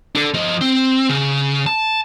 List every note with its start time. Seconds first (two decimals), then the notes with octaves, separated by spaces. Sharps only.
0.15 D4 A4
0.34 F3 D#5
0.61 C4
1.09 C#3
1.66 A5